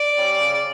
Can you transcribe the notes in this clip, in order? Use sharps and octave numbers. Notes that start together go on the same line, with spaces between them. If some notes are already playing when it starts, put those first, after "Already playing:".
Already playing: D5
G3 C#4
C#3